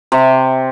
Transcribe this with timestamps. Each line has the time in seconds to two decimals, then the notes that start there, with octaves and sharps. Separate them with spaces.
0.12 C3